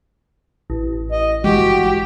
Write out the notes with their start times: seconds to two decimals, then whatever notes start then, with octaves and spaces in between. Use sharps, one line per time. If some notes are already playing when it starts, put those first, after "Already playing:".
0.70 A1
1.12 D#5
1.44 G1 E3 G#3 F#4 G4